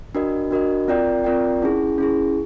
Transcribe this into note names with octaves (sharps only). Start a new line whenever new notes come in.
D4 F#4 A#4 D#5
D4 F#4 A#4 D#5
C4 F4 A#4 D5 G5
C4 F4 A#4 D5 G5
C#4 E4 G#4
C#4 E4 G#4